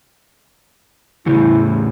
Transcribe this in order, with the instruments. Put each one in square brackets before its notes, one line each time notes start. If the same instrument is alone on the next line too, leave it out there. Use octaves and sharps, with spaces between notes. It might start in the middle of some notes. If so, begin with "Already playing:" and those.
[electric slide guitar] E2 A2 C#3 [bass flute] E4